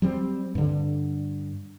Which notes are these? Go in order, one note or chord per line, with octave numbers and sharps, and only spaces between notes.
F#3 G3 A#3 C4
G2 D3